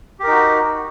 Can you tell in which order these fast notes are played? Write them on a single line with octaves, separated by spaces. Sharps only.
G4 A#4 D#4 F#4